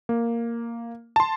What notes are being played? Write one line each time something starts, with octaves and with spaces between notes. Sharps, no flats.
A#3
A5 C6